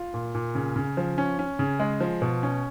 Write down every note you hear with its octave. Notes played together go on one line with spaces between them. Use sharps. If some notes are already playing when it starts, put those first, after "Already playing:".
Already playing: F4
A#2
A#2
C#3
C#3
F3
C#4
C#4
C#3
G#3
F3
B2
C#4